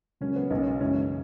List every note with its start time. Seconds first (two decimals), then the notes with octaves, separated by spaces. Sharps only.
0.21 C#2 C#3 F#3 A#3 C#4
0.36 B3
0.50 B1 B2 A#3 C#4
0.80 F#2 C#3 E3 G#3 C#4